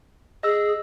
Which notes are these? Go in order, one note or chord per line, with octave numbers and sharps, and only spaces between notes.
G#4 D#5 E6